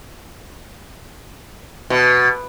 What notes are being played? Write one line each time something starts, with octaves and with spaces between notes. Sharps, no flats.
B2